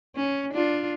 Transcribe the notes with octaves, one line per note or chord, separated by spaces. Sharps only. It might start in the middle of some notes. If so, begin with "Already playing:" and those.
C#4
D4 F4